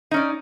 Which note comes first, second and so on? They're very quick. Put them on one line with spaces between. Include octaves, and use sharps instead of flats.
D#4 C#4 D5